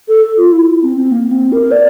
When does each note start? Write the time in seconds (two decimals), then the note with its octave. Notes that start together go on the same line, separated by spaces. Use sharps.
0.08 A4
0.37 F4
0.52 E4
0.83 C4
0.96 C4
1.11 A#3
1.31 C4
1.52 A#4
1.71 D5